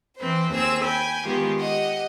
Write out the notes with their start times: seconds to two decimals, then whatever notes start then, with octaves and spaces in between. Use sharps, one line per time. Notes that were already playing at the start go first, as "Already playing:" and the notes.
0.18 E3 C4 B4 C5
0.53 D#2 C4 G#4 E6
0.83 G5 G#5 B5
1.25 D#3 G#3 B3 F4 G4 G#4
1.59 G4 D#5 F#5